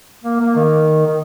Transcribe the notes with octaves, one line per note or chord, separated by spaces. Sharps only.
A#3
A#3
D#3
D#3